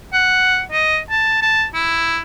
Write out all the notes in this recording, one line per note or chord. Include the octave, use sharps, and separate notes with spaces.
F#5
D#5
A5
A5
E4